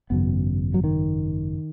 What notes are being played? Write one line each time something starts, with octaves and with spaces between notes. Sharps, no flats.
G#1 F#2 C#3 B3
F#3
D#3